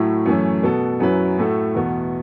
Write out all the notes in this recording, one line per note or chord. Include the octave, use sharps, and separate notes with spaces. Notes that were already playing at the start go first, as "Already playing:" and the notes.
Already playing: A2 F#3 A3 E4
F#2 E3 A3 C#4
B2 B3 A4
F#2 F#3 C#4 E4 B4
A2 A3 F#4 A4
E2 B2 B3 F#4